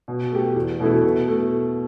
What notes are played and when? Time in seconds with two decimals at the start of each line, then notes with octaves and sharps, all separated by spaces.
0.08 B2
0.32 A3 G4
0.55 E2
0.80 B2 A3 E4 A4
1.04 B2
1.28 A3